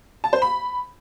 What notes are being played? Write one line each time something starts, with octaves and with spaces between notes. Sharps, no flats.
A5
C5
B5